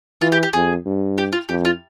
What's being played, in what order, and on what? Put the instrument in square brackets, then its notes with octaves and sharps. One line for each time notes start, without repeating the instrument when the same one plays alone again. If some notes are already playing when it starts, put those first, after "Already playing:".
[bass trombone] E3 [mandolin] F4
[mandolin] G4
G4
[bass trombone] F2 [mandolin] G#4
[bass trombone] G2
[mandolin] G4
F4
[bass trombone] F2 [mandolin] G4
[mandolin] F4